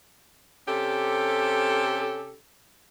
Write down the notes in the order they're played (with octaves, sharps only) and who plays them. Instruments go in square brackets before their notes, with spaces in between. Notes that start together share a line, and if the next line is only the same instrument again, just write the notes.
[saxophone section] C3 C#4 G4 A4